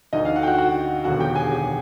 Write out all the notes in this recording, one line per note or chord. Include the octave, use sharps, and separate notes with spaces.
D2 D3 D#4 D#5
F5
F#4 F#5
G5
F#4 F#5
F#4 F#5
E1 D#2 D3 F#4 F#5
G4 G5
G#4 G#5
G4 G5